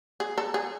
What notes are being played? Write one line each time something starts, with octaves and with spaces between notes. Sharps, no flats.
G#4
A4
G#4